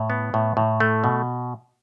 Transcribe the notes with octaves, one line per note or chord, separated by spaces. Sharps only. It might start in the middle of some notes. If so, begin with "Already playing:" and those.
Already playing: A2
B3
A2
A2
A3
B2